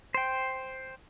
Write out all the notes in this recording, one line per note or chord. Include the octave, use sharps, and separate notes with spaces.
C5 G5